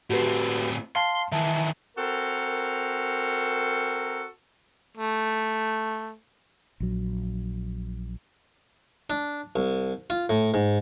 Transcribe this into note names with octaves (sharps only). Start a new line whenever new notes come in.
A2 C4 F#4 G4 B4
F5 A5 C6
D#3 E3 E5 A5
C4 F#4 A4 A#4
A3
A#1 F#3
D4
C2
F4
A2
G#2